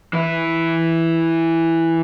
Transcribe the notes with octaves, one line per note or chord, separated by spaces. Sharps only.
E3 E4